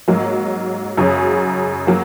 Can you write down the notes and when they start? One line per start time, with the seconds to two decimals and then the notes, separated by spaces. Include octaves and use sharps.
0.08 G#2 F#3 A#3
0.97 F#2 C#3 F#3 C#4 G#4
1.87 F#3 A#3